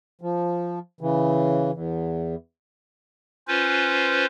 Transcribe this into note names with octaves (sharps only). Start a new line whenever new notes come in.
F3
C#3 E3
E2
C#4 F4 B4 C5